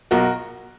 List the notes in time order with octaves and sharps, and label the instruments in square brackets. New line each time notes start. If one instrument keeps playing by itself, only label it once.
[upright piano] B1 F#4 A#4